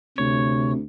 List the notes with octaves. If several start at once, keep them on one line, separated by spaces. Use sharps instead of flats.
D2 C3 C#5